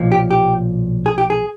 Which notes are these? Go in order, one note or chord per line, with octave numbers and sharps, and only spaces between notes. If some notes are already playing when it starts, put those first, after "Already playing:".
Already playing: B1 A#2 F3
G4
G4
G#4
G4
G#4